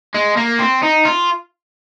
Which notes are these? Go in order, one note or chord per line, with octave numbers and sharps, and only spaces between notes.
G#3
A#3
C4
D#4
F4